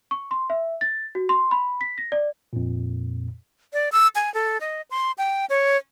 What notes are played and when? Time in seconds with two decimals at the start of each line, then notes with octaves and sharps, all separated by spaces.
0.11 C#6
0.31 C6
0.50 E5
0.81 A6
1.15 F#4
1.29 C6
1.51 B5
1.81 B6
1.98 A#6
2.12 D5
2.53 F2 A#2
3.73 D5
3.92 E6
4.15 G#5
4.34 A4
4.61 D#5
4.91 C6
5.18 G5
5.50 C#5